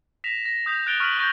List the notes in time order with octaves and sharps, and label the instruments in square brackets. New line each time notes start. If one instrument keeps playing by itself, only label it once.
[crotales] A#6 B6 E7 F7
A#6
D#6 G6 B6 F7
F#6 A6 D7 F7 G7
C#6 F6 F#6 B6 D#7 F#7
C#6 G6 A#6 F#7